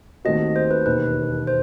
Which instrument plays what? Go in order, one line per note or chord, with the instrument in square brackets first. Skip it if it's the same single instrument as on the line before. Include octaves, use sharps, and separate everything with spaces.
[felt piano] D#2 D#3 A3 C4 F#4 [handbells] D#5
[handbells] C5
B4
[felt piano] E1 D#2 D#3 [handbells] B4
[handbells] C5